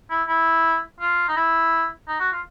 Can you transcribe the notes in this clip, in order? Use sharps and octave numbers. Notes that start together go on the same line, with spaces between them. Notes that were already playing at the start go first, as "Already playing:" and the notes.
E4
E4
F4
D#4
E4
D#4
F#4
F4